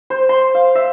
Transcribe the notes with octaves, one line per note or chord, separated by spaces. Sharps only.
C5
C6
F5
E5